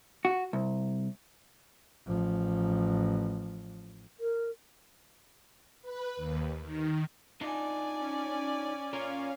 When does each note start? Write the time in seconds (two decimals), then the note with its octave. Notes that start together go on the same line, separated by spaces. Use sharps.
0.25 F#4
0.53 C2
2.06 A1 F3
4.20 A#4
5.82 B4
6.17 D#2
6.62 D#3
7.41 D4 D#4 F4 D5 G#5
8.01 C#4
8.93 C#4 F4 A#4 C#5 F5